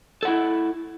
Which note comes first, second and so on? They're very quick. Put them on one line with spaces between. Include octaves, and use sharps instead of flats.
A4 F#5 E4